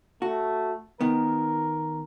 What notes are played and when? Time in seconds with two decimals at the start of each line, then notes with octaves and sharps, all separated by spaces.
0.22 A3 F#4
1.01 D#3 B3 A#4